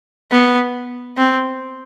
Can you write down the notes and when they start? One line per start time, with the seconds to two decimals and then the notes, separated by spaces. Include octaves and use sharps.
0.31 B3
1.17 C4